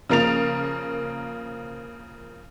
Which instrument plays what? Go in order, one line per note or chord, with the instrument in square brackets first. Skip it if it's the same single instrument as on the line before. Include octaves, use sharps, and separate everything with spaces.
[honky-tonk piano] C#3 F3 A#3 A#4 A6 F7